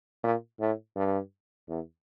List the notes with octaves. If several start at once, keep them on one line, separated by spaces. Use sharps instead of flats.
A#2
A2
G2
E2